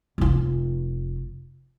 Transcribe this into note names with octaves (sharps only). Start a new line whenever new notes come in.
F1 F4